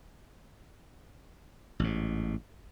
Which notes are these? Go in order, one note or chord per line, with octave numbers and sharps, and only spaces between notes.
A1 G#2